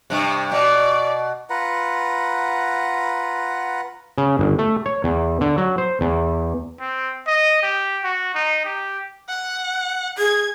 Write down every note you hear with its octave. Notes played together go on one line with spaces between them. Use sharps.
G2 C3
B2 D5
F4 B4 F#5 A#5
C#3
G1
A3
C#5
E2
D3
F#3
C5
E2
C4
D#5
G4
F#4
D#4
G4
F#5
G#4 G#6